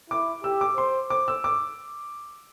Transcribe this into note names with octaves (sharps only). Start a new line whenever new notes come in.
E4 D6
G4 E6
D6
C5 C6
C5 D6
E6
D6